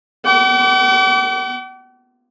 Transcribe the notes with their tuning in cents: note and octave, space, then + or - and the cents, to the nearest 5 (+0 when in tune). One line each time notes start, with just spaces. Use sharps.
F#5 +45 D6 -35